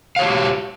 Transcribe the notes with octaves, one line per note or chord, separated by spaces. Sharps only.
F#4 G4 C#5 F5